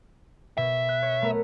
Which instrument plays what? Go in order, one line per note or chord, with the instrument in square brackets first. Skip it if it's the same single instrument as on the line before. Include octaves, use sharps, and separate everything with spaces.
[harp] B2 [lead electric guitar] E5
[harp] F#6
C#5
A3 B3 A#4